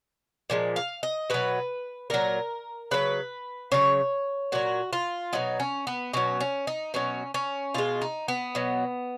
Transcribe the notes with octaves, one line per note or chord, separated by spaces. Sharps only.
A#2 F3 G#3
F5
D#5
B2 F#3 B4
A#2 F#3 A#4
C#3 F#3 B4
C#3 F#3 C#5
A#2 F#3 F#4
F4
B2 F#3 D#4
C#4
B3
B2 F#3 C#4
C#4
D#4
B2 F#3 C#4
C#4
B2 G#3 F4
D#4
B3
B2 F#3